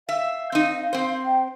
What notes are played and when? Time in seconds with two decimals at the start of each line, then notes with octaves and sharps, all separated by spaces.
0.09 E5 F5
0.52 C4 D#4
0.93 C4 C5
1.25 G5